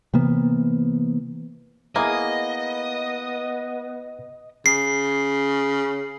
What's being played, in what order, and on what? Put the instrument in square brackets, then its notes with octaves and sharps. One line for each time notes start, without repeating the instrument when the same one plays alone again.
[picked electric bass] C3 E3 A#3 B3
[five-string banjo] A#3 [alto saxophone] B3 [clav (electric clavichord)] E4 G#4 [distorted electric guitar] D#5
[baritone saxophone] C#3 [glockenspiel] C7